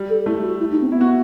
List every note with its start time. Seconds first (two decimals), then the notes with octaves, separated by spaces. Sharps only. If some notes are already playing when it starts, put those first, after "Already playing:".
Already playing: G3
0.09 A4
0.26 A3 E4
0.42 F#4
0.59 E4
0.70 D#4
0.81 C4
0.92 B3 E4
1.01 F#4